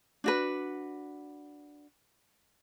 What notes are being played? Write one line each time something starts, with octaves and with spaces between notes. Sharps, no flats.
D4 F#4 B4